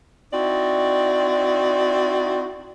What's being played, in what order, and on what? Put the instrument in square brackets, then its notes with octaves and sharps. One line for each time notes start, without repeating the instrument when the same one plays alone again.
[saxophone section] C4 D#4 E4 F#4 D5